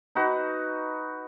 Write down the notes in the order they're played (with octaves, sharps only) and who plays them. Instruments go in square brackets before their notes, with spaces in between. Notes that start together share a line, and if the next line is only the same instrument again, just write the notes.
[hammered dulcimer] D#4 F#4 B4